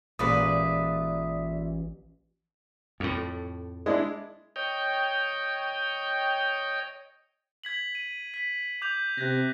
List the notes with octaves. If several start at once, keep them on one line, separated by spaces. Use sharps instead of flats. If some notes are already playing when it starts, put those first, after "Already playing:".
A1 A#2 G#3 B4 D5 E5 D#6
F2 A2
G#3 D4 E4
C#5 D#5 G5
G#6 B6 F#7
D#7
B6
D6 G6 F7
C3 F#6 G#6 A#6